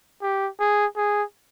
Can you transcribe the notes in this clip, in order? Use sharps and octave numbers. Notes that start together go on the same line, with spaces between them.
G4
G#4
G#4